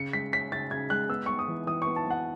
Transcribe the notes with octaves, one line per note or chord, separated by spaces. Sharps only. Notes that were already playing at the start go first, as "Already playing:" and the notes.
Already playing: C#3 C#7
G#3 B6
C#4 B6
C#3 A6
C#3 G#6
G#3 F#6
B3 E6
B3 C#6
D#6
E3
E3 D#6
B3 C#6
A5
B3 F#5